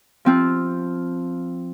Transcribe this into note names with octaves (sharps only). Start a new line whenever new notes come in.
F3 C4 F4